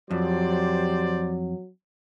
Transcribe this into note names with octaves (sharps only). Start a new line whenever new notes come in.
F2 F#3 G4 C5 D5